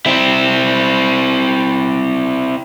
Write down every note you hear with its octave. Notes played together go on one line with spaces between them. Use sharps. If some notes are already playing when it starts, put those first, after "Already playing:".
C4 E4